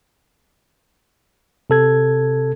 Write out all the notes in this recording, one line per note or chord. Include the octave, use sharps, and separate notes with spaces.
C3 A4 G#6